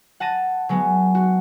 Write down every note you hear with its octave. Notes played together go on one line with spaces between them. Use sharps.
F#5 A5 A#6 D#7
F#3 G#3 B3
F#4